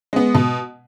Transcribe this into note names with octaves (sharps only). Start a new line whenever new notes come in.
G#3 B3
B2